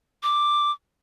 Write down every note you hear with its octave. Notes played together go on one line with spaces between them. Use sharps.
D6